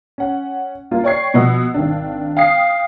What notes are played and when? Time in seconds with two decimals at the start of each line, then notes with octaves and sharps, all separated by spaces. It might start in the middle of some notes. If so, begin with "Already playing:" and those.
0.18 C#4 F#5
0.91 A#3 F4
1.04 C#5 D5 G5 C#6 G#6 C7
1.34 B2 F3 B3 D#5 F#5 E6
1.74 G#1 D#3 D4
2.37 F5 G5 D#6 C7